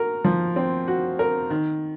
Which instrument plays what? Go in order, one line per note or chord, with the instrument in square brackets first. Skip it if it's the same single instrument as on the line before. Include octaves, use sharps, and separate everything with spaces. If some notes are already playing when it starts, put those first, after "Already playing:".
Already playing: [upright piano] F#4 A#4
F3
C4
F#4
A#4
D#3